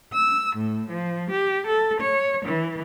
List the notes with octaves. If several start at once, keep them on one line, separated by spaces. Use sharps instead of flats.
E6
A2
F3
G4
A4
C#5
E3